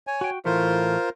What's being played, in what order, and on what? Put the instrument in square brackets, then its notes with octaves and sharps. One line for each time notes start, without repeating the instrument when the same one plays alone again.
[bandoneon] C#5 G#5
[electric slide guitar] F#4 G5
[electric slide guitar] A2 E3 A3 [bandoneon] F4 A#4 C5